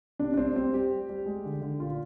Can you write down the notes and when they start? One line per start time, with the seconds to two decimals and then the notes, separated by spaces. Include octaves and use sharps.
0.19 C3 D4
0.34 D4
0.37 G3 C4
0.55 G3 C4
0.73 G3 G4
0.91 G3
1.09 G3
1.26 G#3
1.45 D3
1.62 D3
1.80 A#2 F4